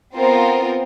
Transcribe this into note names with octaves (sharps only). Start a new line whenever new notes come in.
B3 C4 F4 A#4 C5